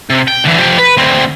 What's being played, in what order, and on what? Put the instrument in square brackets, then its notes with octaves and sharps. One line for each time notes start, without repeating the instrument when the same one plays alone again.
[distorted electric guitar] C3
G5
D3 E3
F3 G4
B4
D2 C4